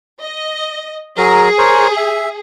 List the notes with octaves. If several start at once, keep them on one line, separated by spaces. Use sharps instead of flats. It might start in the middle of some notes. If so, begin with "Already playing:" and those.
D#5
F#3 G#4 A#4 A#5
A#4 C5 C#5
E5